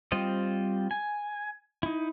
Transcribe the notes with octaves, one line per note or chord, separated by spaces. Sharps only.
G3 C4 F4 C5 D#5
G#5
D#4 E4